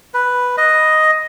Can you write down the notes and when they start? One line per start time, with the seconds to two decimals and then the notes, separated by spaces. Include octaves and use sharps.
0.14 B4
0.58 D#5